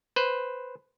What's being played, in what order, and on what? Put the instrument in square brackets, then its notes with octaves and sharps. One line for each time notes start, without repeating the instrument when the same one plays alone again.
[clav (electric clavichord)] B4 C5